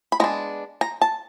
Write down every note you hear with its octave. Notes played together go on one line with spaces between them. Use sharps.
B5
G#3 B3 D4 A#5
A#5
A5